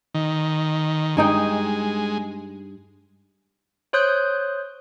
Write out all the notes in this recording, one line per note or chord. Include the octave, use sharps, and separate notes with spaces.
D#3
G2 G#3 D#4 G5
C5 C#5 C6 D#6 F#6 G6